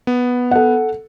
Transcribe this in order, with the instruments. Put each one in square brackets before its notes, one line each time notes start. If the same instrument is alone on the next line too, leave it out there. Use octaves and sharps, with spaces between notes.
[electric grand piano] B3
[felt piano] A4 F#5